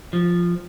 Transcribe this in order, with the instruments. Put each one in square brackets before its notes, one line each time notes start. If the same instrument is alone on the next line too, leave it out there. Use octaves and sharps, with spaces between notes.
[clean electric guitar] F3